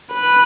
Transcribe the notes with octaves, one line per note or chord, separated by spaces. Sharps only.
B4